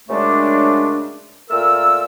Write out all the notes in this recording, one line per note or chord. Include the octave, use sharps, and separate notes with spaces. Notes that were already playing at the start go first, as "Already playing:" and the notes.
F#2 C#3 G#3 A3 D4
A#2 A3 A#4 E6